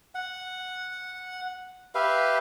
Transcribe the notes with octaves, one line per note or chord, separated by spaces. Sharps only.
F#5
G4 B4 E5 F5